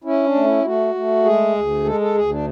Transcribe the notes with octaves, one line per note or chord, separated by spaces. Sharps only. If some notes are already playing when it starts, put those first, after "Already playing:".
C#4 E4
D4
A3
E4
A3 F#4
A3
G#3 G#4
D2
G#3 A4
A4
D2 G#4
D4